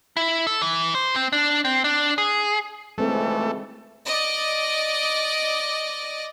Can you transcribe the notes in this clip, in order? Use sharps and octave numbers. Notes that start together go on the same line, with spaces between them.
E4
A4
E3
C5
C4
D4
C4
D4
G#4
G#1 C#2 E3 G#3 A3 C4 A4
D5 D#5